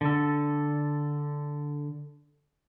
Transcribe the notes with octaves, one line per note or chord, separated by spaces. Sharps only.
D3 A4